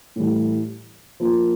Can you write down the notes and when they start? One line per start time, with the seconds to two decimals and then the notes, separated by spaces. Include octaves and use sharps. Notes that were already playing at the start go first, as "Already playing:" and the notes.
0.16 A2 E3 G3
1.20 F3 A#3 F4